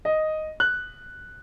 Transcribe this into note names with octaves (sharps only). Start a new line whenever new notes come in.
D#5
F#6